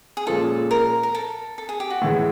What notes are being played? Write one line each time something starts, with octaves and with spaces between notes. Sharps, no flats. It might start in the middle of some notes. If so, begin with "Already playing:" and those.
G#4
A#2 F3 G#3 C#4 F4 A4
A#4
A#4
A4
A4
G#4
G4
F#4
A2 E3 G#3